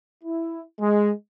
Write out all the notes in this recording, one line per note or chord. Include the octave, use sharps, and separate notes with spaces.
E4
G#3